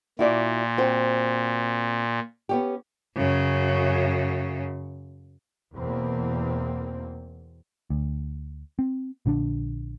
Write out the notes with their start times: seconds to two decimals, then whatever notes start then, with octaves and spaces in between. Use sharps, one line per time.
0.19 A#2 E4 F#4 D5
0.78 C4 F#4 C5
2.49 B3 C#4 G4
3.16 F#2 C#3
5.73 E2 B2 A#3 C4
7.90 D2
8.79 C4
9.26 A#1 D3 C#4 D4